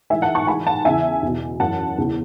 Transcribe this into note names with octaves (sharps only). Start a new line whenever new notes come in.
G#2 E3 E5 G#5
F#5 A5
A5 C#6
G#2 E3 G#5 B5
F#5 A5
E2 C#3 E3 E5 G#5
E2 B2
F#2 E3 F#5 A5
E2 C#3 E3